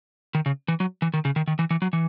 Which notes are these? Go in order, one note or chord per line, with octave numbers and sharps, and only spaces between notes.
D#3
C#3
E3
F#3
E3
D#3
C#3
D#3
D#3
E3
E3
F#3
E3